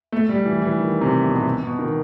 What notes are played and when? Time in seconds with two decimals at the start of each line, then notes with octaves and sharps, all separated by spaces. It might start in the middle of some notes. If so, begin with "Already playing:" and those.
0.12 A3
0.29 G3
0.46 E3
0.62 E3
0.79 D#3
1.01 C3
1.24 B2
1.36 C3
1.45 B2
1.63 B2
1.79 D#3